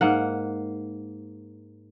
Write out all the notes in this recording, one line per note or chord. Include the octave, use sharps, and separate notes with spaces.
G#2 A#3 F#5